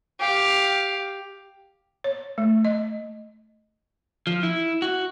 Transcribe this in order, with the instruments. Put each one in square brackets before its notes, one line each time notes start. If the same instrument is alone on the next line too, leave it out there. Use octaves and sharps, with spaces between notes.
[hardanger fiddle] G4 F5
[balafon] C#5
A3
D#5
[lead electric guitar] F3
E4
F#4